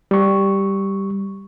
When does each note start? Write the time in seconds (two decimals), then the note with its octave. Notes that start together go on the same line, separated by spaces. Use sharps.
0.11 G3 C#6